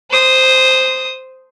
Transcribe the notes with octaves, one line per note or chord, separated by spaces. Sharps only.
C5 D#6